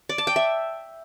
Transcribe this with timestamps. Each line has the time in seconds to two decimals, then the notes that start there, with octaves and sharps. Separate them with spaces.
0.09 D5
0.18 A5
0.27 G5
0.36 E5